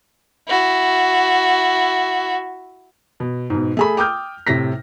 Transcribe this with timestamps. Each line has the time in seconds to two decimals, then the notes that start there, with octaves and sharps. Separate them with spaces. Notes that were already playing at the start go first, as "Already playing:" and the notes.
0.48 E4 F#4
3.20 B2
3.50 G#2 B2
3.77 A3 G#4 B5
3.97 G5 D6 D#6 F6 G6
4.47 A2 C3 A#6 B6